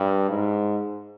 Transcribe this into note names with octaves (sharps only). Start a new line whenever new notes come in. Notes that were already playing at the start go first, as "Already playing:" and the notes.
Already playing: G2
G#2